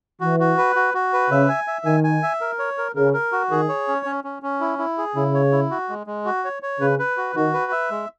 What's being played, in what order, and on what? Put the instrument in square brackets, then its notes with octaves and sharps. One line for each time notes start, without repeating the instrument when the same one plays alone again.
[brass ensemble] E3 [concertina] F#4
[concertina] F#4
B4
F#4
F#4
B4
[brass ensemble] C#3 [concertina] E5
[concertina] G#5
E5
[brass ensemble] D#3 [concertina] G#5
[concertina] G#5
E5
A#4
C#5
A#4
[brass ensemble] C#3 [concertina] A#4
[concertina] A#4
F#4
[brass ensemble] D#3 [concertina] G#4
[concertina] C#5
C#4
C#4
C#4
C#4
E4
E4
G#4
[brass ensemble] C#3 [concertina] E4
[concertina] C#5
E4
F#4
G#3
G#3
F#4
C#5
C#5
[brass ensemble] C#3 [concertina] B4
[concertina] B4
F#4
[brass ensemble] D#3 [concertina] F#4
[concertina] B4
E5
G#3